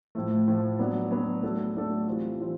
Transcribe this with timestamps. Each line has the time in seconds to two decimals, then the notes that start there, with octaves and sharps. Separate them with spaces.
0.15 A2 F3 A3
0.47 A2 F3 A3
0.79 F#3 B3 D4 F#4
1.11 F#3 B3 D4 F#4
1.43 F#3 A3 D4 F#4 A4
1.75 F#3 A3 D4 F#4 A4
2.07 E3 G3 C4 F4
2.38 E3 G3 C4 F4